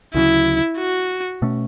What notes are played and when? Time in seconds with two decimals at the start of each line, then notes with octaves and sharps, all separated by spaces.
0.14 D2 C#3 F#3 E4
0.78 F#4
1.42 B2 A3 C#4